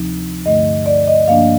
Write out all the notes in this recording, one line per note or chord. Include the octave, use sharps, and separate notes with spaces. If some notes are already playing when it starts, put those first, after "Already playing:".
Already playing: D2 C3 F3 C4 D#4
G2 D3 A3 D#5
D5
D#5
G2 F3 A#3 D4 F5